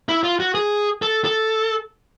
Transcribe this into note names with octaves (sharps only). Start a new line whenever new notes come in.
E4
F4
F#4
G#4
A4
A4